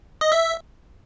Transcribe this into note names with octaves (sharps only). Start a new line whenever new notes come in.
D#5
E5